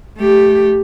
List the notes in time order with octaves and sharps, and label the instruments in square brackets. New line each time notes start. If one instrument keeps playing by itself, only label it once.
[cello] A3 G4